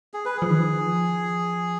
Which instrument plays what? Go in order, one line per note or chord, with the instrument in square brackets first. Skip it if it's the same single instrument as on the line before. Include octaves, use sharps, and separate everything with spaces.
[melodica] G#4
B4
G#4
[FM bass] F3
D#3
F3